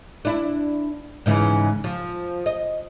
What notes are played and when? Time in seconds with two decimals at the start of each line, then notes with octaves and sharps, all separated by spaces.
0.25 D4 E4
1.26 G#2 C#3 E3
1.84 F3
2.46 D#5